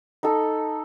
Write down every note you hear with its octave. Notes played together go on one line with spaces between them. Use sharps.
D#4 A4